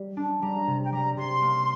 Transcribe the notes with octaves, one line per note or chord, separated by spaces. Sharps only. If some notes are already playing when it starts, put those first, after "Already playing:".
Already playing: G3
D4
G3 A#5
C3
G5
G3 A#5
C3 C6
A#3